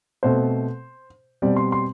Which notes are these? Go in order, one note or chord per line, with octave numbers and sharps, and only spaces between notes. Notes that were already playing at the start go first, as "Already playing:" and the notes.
B2 A3 C4 C5
B2 G3 C4 D5
C6
C6